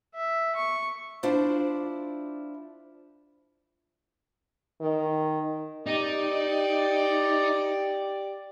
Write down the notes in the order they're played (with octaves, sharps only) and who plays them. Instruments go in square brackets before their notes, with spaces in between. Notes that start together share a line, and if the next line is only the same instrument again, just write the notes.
[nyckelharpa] E5
C#6
[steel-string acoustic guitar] D4 E4 F4 C5 D5
[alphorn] D#3
[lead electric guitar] D#4 [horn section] G4 D5